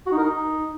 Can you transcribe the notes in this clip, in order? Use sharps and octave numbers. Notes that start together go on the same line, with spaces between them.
F#4
D#4
A#4
D#4